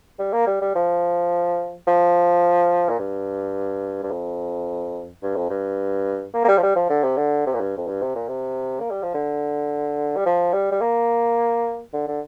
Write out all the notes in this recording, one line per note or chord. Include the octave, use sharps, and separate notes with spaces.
G3
A#3
G3
G3
F3
F3
A#2
G2
G2
F2
G2
F2
G2
A#3
A#3
G3
F3
G3
F3
D3
C3
D3
C3
A#2
G2
F2
G2
C3
A#2
C3
A#3
G3
F3
D3
G3
F3
G3
G3
A#3
D3
D3